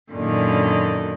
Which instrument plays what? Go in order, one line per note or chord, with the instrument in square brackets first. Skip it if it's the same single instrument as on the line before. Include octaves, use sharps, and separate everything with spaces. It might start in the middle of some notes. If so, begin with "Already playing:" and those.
[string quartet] F#2 A#2 D3 D#3